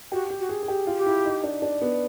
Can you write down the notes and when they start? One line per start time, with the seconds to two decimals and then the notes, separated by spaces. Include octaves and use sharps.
0.12 F#4 G4
0.30 G4
0.40 F#4
0.49 G#4
0.62 G#4
0.68 G4
0.87 F4
0.97 G4
1.06 E4
1.25 D#4
1.44 D4
1.62 D4
1.82 B3